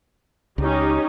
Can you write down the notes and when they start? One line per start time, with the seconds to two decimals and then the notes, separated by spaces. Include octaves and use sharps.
0.58 C#2 C#4 D#4 G4